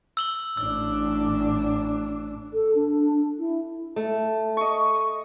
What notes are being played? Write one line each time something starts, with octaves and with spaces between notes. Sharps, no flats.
E6 F#7 G7
A1 D4 E6
A4
D4
E4
A3
D#5 C#6